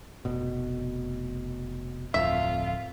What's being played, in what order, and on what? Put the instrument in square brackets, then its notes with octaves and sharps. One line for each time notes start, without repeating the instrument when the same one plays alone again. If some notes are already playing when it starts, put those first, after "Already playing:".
[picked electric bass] F1 B2
[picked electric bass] D1 F2 [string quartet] F4 [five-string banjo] E5